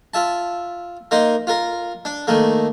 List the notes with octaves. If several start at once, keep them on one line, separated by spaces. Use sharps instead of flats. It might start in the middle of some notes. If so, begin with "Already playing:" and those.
F4 E5 A5
A#3 D#4 C6
F4 A#4
D4
D#3 A3 A#3